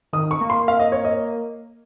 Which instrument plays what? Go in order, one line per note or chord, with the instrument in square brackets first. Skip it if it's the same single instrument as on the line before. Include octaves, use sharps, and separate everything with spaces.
[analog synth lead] D#3 [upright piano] D#6
[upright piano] C#6
[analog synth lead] A#3
[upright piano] C6
F5
D#5
C#5
D#5